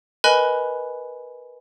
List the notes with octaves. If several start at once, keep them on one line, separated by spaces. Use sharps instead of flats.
A#4 B4 D#5 G#5 B5 F#6